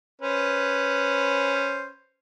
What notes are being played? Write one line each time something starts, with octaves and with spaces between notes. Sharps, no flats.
C#4 B4 C5